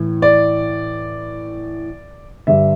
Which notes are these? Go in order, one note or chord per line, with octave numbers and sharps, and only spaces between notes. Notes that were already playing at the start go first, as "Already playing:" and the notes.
Already playing: A2 E3
D5
G2 D3 E5